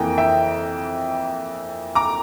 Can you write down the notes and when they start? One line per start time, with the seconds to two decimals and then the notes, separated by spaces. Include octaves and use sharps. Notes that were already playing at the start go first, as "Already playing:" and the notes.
Already playing: F2 E3 A#3 G5 A#5
0.18 E5 G5
1.95 A#5 D6